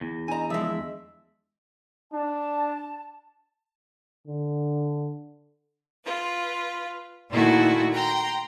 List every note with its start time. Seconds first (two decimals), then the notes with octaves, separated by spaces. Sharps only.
0.01 E2
0.28 D4 D#5 G#5 A#5
0.50 F3 G#3 E5
2.12 D4 A5
4.27 D3
6.04 F4 B4
7.29 A#2 D#3 A3 A#3 E4 F#4
7.92 G5 A#5 C6